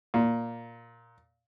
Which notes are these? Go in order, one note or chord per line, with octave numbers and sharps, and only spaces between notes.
A#2